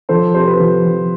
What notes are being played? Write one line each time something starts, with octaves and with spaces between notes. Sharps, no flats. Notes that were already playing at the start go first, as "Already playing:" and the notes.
F3 A4 C5
C3 A4 C5
G4 B4
F3
F3